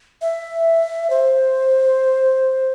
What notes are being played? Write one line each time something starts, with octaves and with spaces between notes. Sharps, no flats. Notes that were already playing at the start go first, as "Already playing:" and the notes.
E5
C5